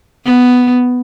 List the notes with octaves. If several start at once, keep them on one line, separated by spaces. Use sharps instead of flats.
B3